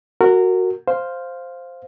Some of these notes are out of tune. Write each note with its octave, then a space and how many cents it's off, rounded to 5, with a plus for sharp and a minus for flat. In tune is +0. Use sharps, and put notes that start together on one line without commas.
F#4 +0 A#4 -25
C5 +0 F5 +0